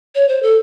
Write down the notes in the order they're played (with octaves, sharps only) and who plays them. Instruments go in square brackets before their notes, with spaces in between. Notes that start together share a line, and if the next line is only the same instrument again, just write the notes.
[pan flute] C#5
C5
A4